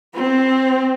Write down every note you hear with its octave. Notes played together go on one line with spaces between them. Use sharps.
C4